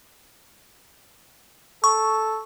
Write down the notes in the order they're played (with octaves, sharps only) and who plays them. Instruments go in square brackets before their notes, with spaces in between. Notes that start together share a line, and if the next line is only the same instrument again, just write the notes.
[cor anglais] A4 [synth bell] C#6